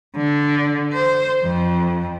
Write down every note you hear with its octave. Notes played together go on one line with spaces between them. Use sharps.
D3
C5
F2